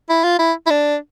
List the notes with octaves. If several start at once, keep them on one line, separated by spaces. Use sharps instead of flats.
E4
F4
E4
E4
D4